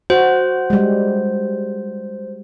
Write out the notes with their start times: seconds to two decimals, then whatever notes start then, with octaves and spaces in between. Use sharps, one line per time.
0.10 F#4 C5
0.70 G3 G#3